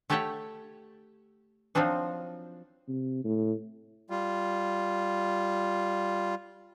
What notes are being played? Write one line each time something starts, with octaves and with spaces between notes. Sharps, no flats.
A3 G4 A4 C#5 F#5 G5
F3 F#3 C4 D4 D#4
C3
A2
G3 F4